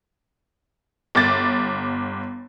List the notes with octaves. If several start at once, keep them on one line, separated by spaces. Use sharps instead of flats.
G1 D6 A6